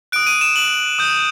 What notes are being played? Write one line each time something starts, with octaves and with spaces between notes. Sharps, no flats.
D#6 F#6 D7
D#7
E7
F#7
D#6 G6